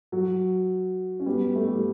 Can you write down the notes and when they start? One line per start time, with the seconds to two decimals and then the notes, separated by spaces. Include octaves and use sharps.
0.12 F#3
1.20 C#4
1.26 G3 B3
1.55 A3
1.67 G3